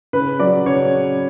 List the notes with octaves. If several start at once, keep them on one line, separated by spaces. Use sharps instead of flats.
C#3 B4
F#3 D5
C#3 C#5